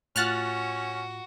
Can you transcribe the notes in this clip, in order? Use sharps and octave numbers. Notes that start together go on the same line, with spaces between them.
A2 C#4 F4 F#4 F6 F#6 A6